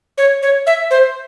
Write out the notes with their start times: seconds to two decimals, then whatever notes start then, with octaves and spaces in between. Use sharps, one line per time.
0.18 C#5
0.42 C#5
0.67 E5
0.91 C5